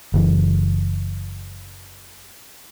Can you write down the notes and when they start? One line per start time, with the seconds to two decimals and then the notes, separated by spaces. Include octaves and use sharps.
0.14 F#1 E3